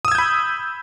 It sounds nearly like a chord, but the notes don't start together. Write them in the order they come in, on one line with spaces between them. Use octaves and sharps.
D#6 E6 G#6 G6 B5